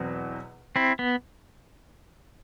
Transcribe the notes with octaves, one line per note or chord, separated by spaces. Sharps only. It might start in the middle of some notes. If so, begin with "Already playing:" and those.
Already playing: E2 B2 F#3 C4
C4 E4
B3